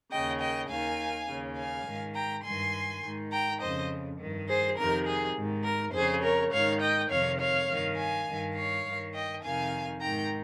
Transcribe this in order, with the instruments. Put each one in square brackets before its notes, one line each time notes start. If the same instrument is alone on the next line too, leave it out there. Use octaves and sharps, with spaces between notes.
[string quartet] D#2 C#3 D#5 G5
D#5 G5
D#2 D#3 F5 G#5
D#2 C#3
F5 G#5
G#2 D#3
G5 A#5
G2 D#3 G#5 C6
G#2 D#3
G5 A#5
F2 C#3 C5 D#5
G2 D#3
G#4 C5
F2 C3 D#3 A#4
G#4
G#2 D#3
A#4
F2 C#3 G#4 C5
A#4 C#5
G#2 D#3 C#5 F5
D#5 G5
F2 C3 D#3 C#5 F5
C#5 F5
G2 D#3
F5 G#5
G2 D#3
C#5 F5
G2 D#3
D#5 G5
F2 C3 D#3 F5 G#5
G#2 D#3 G5 A#5